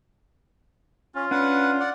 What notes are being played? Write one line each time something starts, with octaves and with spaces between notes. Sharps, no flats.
C#4 F4
C#4 D4 B4 F#5
D5 F#5